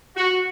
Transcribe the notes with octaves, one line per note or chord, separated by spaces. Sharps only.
F#4